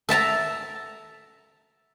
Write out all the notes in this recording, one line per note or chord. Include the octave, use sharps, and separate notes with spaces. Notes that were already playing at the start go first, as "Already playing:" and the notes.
A4 E5 A5 A#5